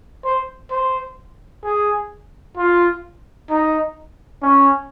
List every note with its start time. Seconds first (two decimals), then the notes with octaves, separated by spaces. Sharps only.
0.25 C5
0.71 C5
1.64 G#4
2.57 F4
3.50 D#4
4.42 C#4